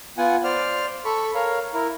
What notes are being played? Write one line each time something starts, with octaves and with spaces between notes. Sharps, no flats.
B3 F4 F#5 G#5
C5 D5 F6
A4 B5 C#6
A#4 C#5 F5
E4 A#4